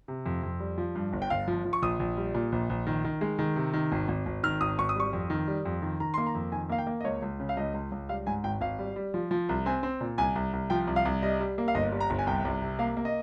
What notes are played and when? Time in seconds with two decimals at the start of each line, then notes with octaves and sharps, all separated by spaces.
0.08 C3
0.26 F2
0.43 F2
0.60 G3
0.78 F3
0.95 G2
1.13 G1
1.22 G5
1.30 G1 F5
1.48 F3
1.65 F3
1.73 C#6
1.82 A#1 D#6
1.99 A#1
2.17 G3
2.34 A#2
2.52 A#1
2.69 A#1
2.87 D#3
3.04 D#3
3.21 G#3
3.39 D#3
3.56 C3
3.73 D#3
3.92 G#1
4.08 G#1
4.26 G#1
4.43 D#3 F6
4.61 G#1 D#6
4.78 G#1 C#6
4.89 D#6
4.96 G3 C#6
5.13 F2
5.30 D#3
5.48 G3
5.65 F2
5.82 D#3
6.00 D#3 A#5
6.14 A#3 C6
6.27 A#5
6.35 F2
6.52 D#3 G#5
6.69 A#3 F5
6.78 G5
6.87 A#3
7.01 D#5
7.04 C#2 C#5
7.22 C#2
7.40 C#3
7.49 F5
7.57 C#2 D#5
7.74 C#2
7.92 C#2
8.09 G3 F5
8.27 G#2 G#5
8.44 G#1 G5
8.61 G#1 F5
8.79 G3
8.96 G3
9.14 F3
9.31 F3
9.49 C2
9.66 C4 G#5
9.83 C4
10.01 A#2
10.18 C2 G#5
10.35 C2
10.53 C2
10.70 F3 G5
10.87 C2
10.96 F5
11.05 C2
11.22 G3 D#5
11.40 G3
11.58 A#3
11.68 F5
11.75 G1 D#5
11.92 G3
12.00 A#5
12.10 G1
12.19 G#5
12.27 C2 G5
12.45 C2
12.62 C3
12.79 A#3 F5
12.97 A#3
13.05 D#5